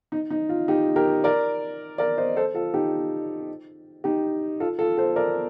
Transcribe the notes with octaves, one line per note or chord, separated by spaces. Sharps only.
D#4
D#4
F4
D#4 G4
G4 A#4
A#4 D5
A#4 D5
C5 D#5
A4 C5
F4 A4
D#4 G4
D#4 G4
F4 A4
F4 A4
A4 C5
A#4 D5